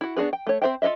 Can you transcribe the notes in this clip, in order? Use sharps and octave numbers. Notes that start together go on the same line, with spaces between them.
E4 F#4
B3 D4 F#4 G#4 B4
G5
A3 C#5
C4 G#4 C5 E5 G5
F4 A4 B4 D#5 E5